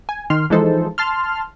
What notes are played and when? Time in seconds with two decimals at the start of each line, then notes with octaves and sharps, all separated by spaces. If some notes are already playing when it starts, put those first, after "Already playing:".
0.09 G#5
0.30 D#3 C6 F6
0.50 E3 F3 G#3 D#4 A4 C5
0.98 A5 C6 F6